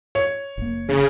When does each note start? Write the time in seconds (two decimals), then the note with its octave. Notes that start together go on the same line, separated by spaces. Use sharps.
0.15 C#5
0.58 F#1 A#3
0.89 C#3 G#4